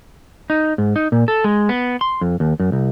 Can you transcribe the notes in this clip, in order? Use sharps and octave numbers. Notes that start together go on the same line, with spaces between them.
D#4
G#2
D#4
A#2
A4
G#3
B3
C6
F2
D#2
F#2
C2